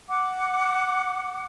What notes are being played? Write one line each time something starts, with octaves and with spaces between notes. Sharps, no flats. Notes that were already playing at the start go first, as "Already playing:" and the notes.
F#5 D6